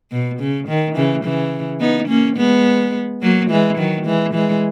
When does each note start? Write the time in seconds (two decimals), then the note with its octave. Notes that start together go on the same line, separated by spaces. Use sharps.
0.12 B2
0.40 C#3
0.68 D#3
0.95 C#3 E3
1.24 C#3 E3
1.80 B3 D#4
2.08 A#3 C#4
2.37 G#3 B3
3.22 F#3 A#3
3.50 E3 G#3
3.78 D#3 F#3
4.06 E3 G#3
4.34 E3 G#3